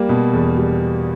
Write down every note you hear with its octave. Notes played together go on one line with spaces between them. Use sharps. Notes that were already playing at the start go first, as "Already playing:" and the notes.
Already playing: G3 A#3
B2
E2
G3